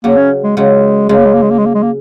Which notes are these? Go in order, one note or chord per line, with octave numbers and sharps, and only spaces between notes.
C#3 F#3 A#3
C#4
G#3
C#3 F#3 G#3
C#3 G#3
A#3
G#3
A#3
G#3
A#3
G#3
A#3
G#3
A#3